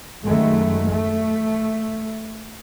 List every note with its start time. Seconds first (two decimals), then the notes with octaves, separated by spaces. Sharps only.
0.24 F#2 D#3 G#3 A3
0.88 A3